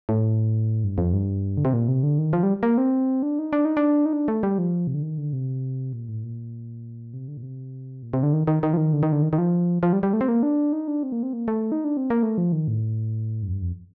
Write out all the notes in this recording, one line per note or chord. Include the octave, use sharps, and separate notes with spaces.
A2
G2
F2
G2
D3
C3
A#2
C3
D3
D#3
F3
G3
A#3
C4
D4
D#4
D4
D#4
D4
D#4
D4
A3
G3
F3
C3
D3
D#3
D3
C3
A#2
A2
A#2
C3
D3
A#2
C3
A#2
C3
D3
D#3
D#3
D#3
F3
D#3
D3
D#3
D3
D#3
D#3
F3
F3
G3
G3
A3
C4
A#3
D4
D#4
D4
C4
A#3
C4
A#3
A3
D#4
D4
C4
A#3
A3
F3
D#3
A2
G2
F2
G2
F2